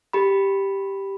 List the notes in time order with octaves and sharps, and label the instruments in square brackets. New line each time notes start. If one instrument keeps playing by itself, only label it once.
[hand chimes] G4 B5